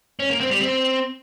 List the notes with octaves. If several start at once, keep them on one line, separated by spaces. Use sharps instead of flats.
C#4
A#3
C4
G3
C4